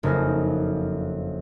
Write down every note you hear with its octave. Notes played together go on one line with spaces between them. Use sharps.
F#1 F2 D#4 G#5 F6 A#6